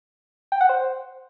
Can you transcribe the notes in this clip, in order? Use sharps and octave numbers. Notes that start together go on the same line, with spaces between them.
G5
F#5
C5